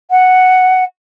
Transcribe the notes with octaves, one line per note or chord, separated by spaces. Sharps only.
F#5